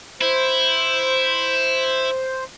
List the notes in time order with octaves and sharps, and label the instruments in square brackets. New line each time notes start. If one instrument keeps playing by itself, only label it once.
[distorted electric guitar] E4 [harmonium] C5